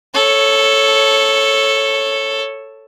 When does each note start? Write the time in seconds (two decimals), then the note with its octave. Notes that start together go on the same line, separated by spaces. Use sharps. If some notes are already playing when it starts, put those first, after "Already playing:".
0.14 A4 C#5